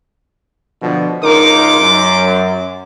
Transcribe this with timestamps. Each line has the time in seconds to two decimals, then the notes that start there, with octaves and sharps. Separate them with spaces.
0.82 B2 D3 F3
1.23 C#2 D#4 A#4 C6 D6
1.80 F#2